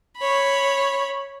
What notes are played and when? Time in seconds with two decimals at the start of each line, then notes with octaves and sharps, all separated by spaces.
0.18 C#5 B5